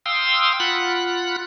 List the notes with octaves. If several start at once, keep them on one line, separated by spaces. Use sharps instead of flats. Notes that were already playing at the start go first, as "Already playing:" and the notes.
F5 G5 C6 D#6 E6
F4 F#5 B5 F#6